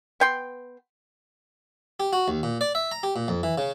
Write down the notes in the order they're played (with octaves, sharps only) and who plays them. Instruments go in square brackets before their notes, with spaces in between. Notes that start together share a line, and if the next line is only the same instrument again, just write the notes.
[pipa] B3 G5 C6
[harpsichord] G4
F#4
D#2
A#2
D5
E5
A#5
G4
A#2
F2
E3
C#3